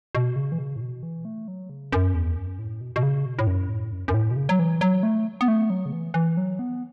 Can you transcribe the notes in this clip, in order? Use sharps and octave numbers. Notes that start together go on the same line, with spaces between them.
B2
C#3
E3
C#3
A2
B2
E3
A3
F#3
C#3
F#2
E2
F#2
A2
B2
B2
C#3
B2
A2
F#2
A2
F#2
F#2
A2
B2
C#3
F#3
E3
F#3
A3
B3
A3
F#3
C#3
E3
E3
F#3
B3